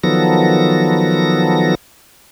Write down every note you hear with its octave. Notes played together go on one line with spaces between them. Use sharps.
D#3 F3 F#3 B3 A4 A#6